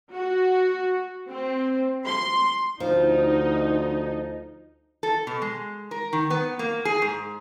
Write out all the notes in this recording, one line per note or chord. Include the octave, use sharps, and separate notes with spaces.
F#4
C4
C6
D2 F3 D#4
A4
B2
G#3
A#4
D#3
B3
A#3
G#4
G#2